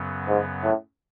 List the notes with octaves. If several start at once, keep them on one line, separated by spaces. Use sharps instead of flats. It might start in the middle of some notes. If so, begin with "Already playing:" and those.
Already playing: F#2 C#3 F#3 B3
G#2
A2